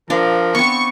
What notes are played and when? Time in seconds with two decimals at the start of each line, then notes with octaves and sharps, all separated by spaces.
0.10 F3 D4 A#4 F5
0.55 B3 C4 C#6